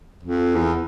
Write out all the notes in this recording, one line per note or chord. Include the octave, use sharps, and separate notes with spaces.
F2
E2